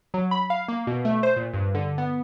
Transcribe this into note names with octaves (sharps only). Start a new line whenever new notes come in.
F#3
B5
F5
A#3
B2
A3
C5
A#2
G2
D3
B3